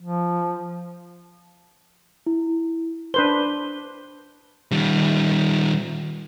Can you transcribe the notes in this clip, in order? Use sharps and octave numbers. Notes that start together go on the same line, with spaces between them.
F3
E4
D4 B4 C5 G7
D#3 G3